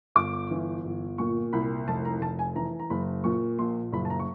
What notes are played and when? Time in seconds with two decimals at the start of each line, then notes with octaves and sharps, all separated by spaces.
0.15 G1 D6
0.51 E3
0.85 G1
1.18 A#2 C#6
1.53 C2 B5
1.88 F1 A5
2.05 A#5
2.21 F1 A5
2.39 G#5
2.55 E3 A#5
2.80 A#5
2.90 F#1 B5
3.24 A#2 C#6
3.59 A#1 C6
3.92 F#1 B5
4.05 A5
4.10 A#5
4.20 C#6